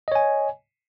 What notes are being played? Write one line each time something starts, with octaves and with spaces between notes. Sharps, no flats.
C#5 D#5 G#5